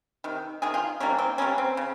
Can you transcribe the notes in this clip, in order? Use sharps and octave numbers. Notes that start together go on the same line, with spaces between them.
C3 D#3
C3 D#3 G#4
F4
C3 D#3 G3 A#3 C#4
C4
C3 D#3 G3 A#3 C#4
C4
C#3